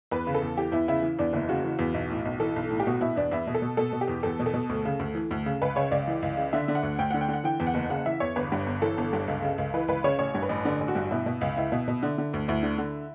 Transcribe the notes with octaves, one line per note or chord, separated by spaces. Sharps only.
E2 B4
C#3
A4
E2
E3 G4
E2 E4
C#3 E4
E3
E2 D4
F#1 E4
C#3 F#4
E3
E2
B1
A2
B1
E3 A4
B1
A2
G4
B2 F#4
B2 E4
E2 D4
E2 E4
B2
A4
B2
B2 A4
B2
G4
E2
E2 A4
B2
A4
B2
D2
C#3
D2
E3
D2
C#3
C#2 B4
C#3 C#5
C#2 D5
E3
C#2
C#3
D3 E5
D3
F#5
D2
D2 G5
D3 F#5
G5
D3
F#5
E3 G5
E2
F#5
F#1
C#3 F#5
E3 E5
E2 C#5
G1 B4
G2
G1
E3 A4
G1
G2
C#2
C#3
C#2
E3 B4
C#2 B4
C#3 C#5
A1 C#5
G2
B4
A1
D3
A1
F#4
G2
B2 E4
B2
C#2
C#2 E4
B2
B2
D3
D3
D2
D2 E4
D3
D3